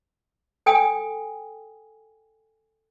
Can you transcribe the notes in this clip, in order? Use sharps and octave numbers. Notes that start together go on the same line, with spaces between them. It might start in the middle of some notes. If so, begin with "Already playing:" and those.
A4 G5 G#5 D#6